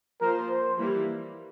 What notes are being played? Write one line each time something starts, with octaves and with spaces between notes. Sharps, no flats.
F3 A#3 F4 A#4 C5
C5
E3 G3 A#3 E4